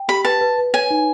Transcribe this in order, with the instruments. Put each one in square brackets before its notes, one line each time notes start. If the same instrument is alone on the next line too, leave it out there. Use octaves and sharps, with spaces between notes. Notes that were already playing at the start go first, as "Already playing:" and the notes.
Already playing: [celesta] G5
[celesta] G4 [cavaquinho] B5
[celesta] B4 [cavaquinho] A5
[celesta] B4
B4
[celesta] C#5 [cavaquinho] G#5
[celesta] D#4